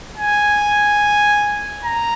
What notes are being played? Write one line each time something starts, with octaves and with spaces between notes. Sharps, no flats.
G#5
A#5